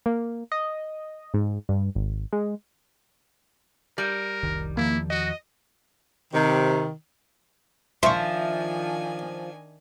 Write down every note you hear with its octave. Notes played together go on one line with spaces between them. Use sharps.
A#3
D#5
G#2
G2
G#1
G#3
G3 A#4
F1 C2 D#3
E2 D#3 F3 A#3 E4
F#4 D#5
C3 D#3
D#3 F3 D4 E5 G#5 C6 C#6